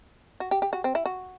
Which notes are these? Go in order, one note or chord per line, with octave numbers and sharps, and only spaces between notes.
F#4
G4
G4
F#4
C4
E4
F#4